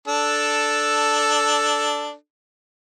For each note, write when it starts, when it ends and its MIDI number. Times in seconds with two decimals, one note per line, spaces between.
0.08 2.14 62
0.08 2.14 69